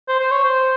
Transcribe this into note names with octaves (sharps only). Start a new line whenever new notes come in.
C5
C5
C#5
C5